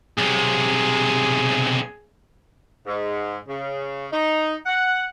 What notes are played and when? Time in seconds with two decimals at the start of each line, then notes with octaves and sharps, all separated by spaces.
0.18 B1 C3 G#4
2.86 G#2
3.48 C#3
4.12 D#4
4.66 F#5